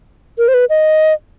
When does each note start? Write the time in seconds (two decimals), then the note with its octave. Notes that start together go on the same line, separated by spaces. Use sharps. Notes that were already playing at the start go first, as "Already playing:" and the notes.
0.38 A#4
0.48 C5
0.54 B4
0.70 D#5